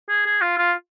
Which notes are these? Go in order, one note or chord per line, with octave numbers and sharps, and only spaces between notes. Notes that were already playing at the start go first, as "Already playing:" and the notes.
G#4
G#4
F4
F4